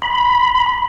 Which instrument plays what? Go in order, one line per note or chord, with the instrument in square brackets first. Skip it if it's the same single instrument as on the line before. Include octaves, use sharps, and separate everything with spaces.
[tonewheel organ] B5